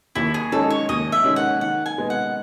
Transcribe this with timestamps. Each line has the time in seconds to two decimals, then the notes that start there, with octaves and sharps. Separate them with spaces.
0.15 D#2 E4
0.34 G#4
0.52 D#3 G#3 C#4 A4
0.70 C#5
0.89 D#2 D#5
1.12 E5
1.24 D#3 G#3 C#4
1.36 F#5
1.61 D#3 F#5
1.86 G#5
1.98 G#3 B3
2.10 F#5